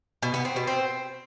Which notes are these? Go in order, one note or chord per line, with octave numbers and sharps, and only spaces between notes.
B2
B3
C4
B2
C4